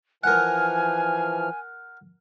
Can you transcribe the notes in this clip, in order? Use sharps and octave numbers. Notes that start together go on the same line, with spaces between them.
E3 F3 A#4 F#5 G#5 F6